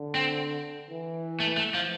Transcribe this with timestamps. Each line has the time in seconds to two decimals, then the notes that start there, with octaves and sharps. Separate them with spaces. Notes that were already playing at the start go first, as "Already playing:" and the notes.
Already playing: D3
0.15 C4
0.90 E3
1.40 A3
1.57 A3
1.74 F3